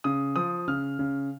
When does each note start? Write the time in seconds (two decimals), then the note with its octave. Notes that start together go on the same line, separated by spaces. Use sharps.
0.04 C#3 D#6
0.36 F3 D#6
0.68 C#3 F6
0.99 C#3